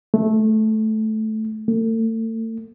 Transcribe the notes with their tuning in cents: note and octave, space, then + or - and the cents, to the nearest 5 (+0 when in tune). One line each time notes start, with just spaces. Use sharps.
A3 -15
A3 +35